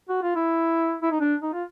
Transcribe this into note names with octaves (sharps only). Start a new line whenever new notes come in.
F#4
F4
E4
E4
D#4
D4
D#4
F4